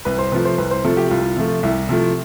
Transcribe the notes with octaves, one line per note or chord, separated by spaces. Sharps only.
C2 B4
C5
C3 F3 A3 B4
C5
C2 B4
C5
C3 F3 A3 A4
G4
C2 F4
C3 F3 A3
C2 E4
C3 F3 A3